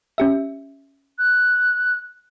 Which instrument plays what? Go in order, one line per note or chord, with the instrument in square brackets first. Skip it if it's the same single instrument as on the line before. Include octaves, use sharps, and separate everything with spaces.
[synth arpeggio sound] C#4 G4 E5
[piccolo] F#6